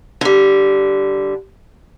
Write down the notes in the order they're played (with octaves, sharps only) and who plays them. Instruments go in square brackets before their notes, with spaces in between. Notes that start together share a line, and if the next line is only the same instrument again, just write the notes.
[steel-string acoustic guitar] D3 G3